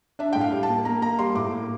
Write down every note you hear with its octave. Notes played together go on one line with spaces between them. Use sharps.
D4 E5
A2 G5
F5
G3
A5
A#3
A#3 A#5
A#3 A#5
G3 C6
A2 D6
A#3